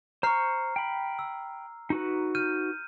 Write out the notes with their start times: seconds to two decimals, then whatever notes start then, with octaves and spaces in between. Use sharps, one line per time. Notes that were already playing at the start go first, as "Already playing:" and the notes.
0.23 C5 A#5 C#6 F6 C7
0.76 G5 B5
1.19 E6
1.90 D#4 F#4 B4
2.35 F6 G6 D#7